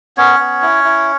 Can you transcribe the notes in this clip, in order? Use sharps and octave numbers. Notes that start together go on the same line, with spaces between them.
B3 C#4 C#5
B3
E4
E4